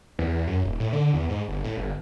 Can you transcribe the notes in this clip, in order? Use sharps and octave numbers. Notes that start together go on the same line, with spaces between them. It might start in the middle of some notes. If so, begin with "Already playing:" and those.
E2
F#2
D#1
A2
D3
E2
G#2
G1
A2
G1